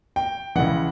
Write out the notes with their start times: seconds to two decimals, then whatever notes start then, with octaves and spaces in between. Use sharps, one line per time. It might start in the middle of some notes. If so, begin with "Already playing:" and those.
0.16 G5
0.55 C#2 C#3 E3 F#5